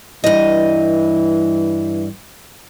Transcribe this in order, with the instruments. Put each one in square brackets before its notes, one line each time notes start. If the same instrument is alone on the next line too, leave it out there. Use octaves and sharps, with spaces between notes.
[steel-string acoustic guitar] G2 D#5 [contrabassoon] E3